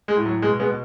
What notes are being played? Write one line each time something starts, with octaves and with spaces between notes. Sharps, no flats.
G#3
A2
F#3
B2 G#3
G#3 B3
B2